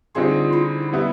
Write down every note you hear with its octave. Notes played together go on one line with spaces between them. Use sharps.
D3 G3 C4 D#4 F4 G#4
E4
G3 B3 E4